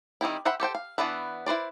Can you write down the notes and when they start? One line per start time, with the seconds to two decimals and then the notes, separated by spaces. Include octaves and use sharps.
0.21 D#3 G3 C4 E4
0.45 C5 E5 F#5 G5 B5
0.60 G4 A4 C5 G5
0.75 F5
0.98 E3 B3 D4 B4 E5
1.46 E4 B4 C5 D5